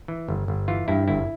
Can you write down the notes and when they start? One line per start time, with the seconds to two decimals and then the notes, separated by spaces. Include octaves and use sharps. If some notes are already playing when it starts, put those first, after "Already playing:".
0.08 E3
0.28 G1
0.48 G1
0.68 E3 F4
0.88 G2 E4
1.08 G1 E4